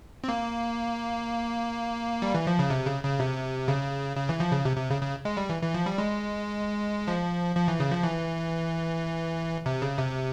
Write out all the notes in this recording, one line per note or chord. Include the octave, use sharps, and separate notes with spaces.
C4
A#3
G3
E3
F3
C#3
C3
C#3
C#3
C3
C#3
C#3
E3
F3
C#3
C3
C3
C#3
C#3
G#3
G3
E3
E3
F3
G3
G#3
F3
F3
E3
C#3
F3
E3
C3
C#3
C3